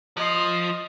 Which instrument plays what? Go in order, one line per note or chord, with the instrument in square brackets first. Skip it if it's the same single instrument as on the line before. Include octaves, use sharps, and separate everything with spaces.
[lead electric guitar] F3 [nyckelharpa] D#5 C6